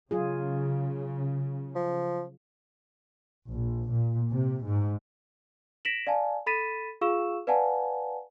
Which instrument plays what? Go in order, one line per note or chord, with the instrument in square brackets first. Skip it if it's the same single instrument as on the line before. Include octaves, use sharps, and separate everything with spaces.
[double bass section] C#3 [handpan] F#3 F4 G#4
[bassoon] F3
[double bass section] A#1
A#2
C3
G#2
[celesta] A#6 B6 D7 E7 F#7
D5 F5 G#5 A5
A4 B5 A6 B6 D#7 E7
F4 G#4 F5 C#6 E6 E7
B4 D5 F5 F#5 G#5 A5